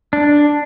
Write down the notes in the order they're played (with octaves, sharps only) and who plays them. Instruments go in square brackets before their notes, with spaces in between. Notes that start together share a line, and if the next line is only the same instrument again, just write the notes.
[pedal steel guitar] D4